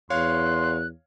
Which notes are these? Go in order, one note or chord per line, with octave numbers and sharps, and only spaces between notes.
E2 C#5 F5 C6 F#6